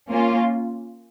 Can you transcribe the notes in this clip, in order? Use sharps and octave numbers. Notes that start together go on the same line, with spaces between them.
A#3 C#4 F4